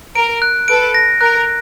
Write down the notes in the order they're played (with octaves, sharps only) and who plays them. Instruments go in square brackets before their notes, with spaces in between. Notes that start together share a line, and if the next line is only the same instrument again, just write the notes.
[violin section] A#4 [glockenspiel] D7
[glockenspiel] F#6
[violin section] A4 B4 [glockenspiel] D7
[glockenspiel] A#6
[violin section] A#4 [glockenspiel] F#6